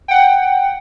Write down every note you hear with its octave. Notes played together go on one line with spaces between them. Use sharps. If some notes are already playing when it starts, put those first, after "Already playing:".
F#5 G5